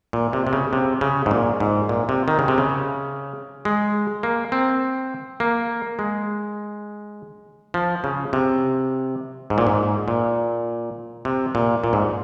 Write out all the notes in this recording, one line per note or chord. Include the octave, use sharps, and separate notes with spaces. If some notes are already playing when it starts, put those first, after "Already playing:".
A#2
C3
C3
C#3
C3
C#3
G#2
A#2
G#2
A#2
C3
D#3
C#3
C3
C#3
G#3
A#3
C4
A#3
G#3
F3
C#3
C3
G#2
A#2
G#2
A#2
C3
A#2
A#2
G#2